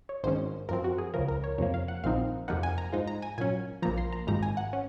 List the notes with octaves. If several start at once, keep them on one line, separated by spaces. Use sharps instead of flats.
C#5
G#1 G#2 D#3 G#3 C#4 C5
F#2 F3 C4 A#4
F#4
G#4
C#2 C#3 F3 A#4
A#4
C#5
F2 C3 F3 A#3 C#5
F5
F#5
A#1 A#2 F3 C4 D#4 F5
F2 C3 F3 A#3 D#4 F#5
G#5
A#5
G#2 F3 G#3 D#4
A#5
G#5
A#2 F#3 C#4 G#5
A#1 A#2 F3 A#5
C6
A#5
G#1 G#2 F3 A#5
G#5
F#5
C#4